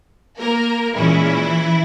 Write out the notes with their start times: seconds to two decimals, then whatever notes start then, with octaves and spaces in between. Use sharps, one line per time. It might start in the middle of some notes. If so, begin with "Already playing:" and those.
0.39 A#3 A#4
0.95 A#2 E3 G#3 C#4 E4